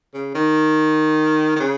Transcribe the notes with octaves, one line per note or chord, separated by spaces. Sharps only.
C#3
D#3
D#3
C#3